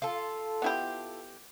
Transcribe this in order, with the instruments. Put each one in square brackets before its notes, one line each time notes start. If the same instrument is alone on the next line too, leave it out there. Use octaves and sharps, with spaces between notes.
[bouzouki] F4 A4
[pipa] B3 E4 G4